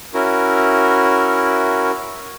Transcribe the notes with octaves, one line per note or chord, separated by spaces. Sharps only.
C#4 E4 F#4 A#4